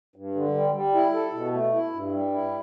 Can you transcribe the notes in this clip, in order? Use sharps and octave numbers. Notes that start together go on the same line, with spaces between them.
G2
D3
G3
G3
E4
A4
B2
A3
E4
G2
G3
E4